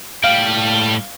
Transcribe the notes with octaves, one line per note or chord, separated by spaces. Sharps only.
A2 G3 F5 G5